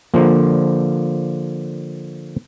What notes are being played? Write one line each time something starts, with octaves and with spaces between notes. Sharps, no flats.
D3 F3 A#3